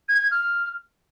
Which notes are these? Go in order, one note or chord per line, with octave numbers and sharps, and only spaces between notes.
G#6
G#6
F6